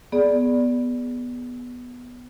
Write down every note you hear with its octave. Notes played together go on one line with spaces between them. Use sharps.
B3 G#4 D5